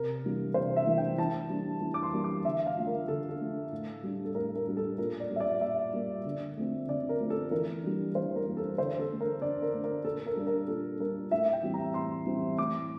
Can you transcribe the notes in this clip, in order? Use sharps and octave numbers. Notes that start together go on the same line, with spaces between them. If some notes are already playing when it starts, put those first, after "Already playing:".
Already playing: C3 A#4
E3 G3 A#3 D4
C3 C5
E5
E3 G3 A#3 D4
G5
E3 A5
G3 A#3 D4
E3
D6
C6
G3 A#3 D4
D6
D3 E5
F5
F3 A3 D4
A#4
D3 A4
A4
F3 A3 D4
A2
G3 D4
A4
A2 A#4
A#4
G3 D4
A4
A#2 A#4
D5
G3 A#3
E5
D5
A#2 E5
G3 A#3
D3
F3 A3 C4
D3 D5
A#4
F3 A3 C4
A4
E3 A#4
G3 A#3 D4
E3 C5
A#4
G3 A#3 D4
A4
D3 C5
A4
A3 D4
A#4
D3 D5
A#4
A3 D4
A#4
A#2 A4
A#4
G3 D4
A#4
A#2 A4
G3 D4 A#4
A2 E5
G5
E3 G3 C4
A#5
A2 C6
E3 G3 C4
A2 D6